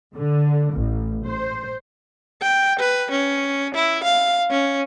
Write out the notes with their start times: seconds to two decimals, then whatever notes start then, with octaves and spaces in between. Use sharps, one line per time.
0.15 D3
0.73 A1
1.24 C5
2.41 G5
2.79 B4
3.11 C#4
3.74 E4
4.03 F5
4.50 C#4